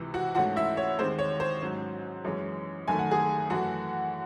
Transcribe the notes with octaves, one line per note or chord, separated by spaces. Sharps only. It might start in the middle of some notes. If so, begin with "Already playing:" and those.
Already playing: C#2 C3 E3
F#4 F#5
G#2 E3 A3 C#4 F#4 F#5
E4 E5
C#5
D#2 D#3 G#3 C4 C5
C#5
C5
G#2 F#3 C#4
F#2 E3 G#3 C#4
F#1 F#2 D#3 A3 G#5
F#5
G#4 G#5
F#2 E3 A3 F#4 F#5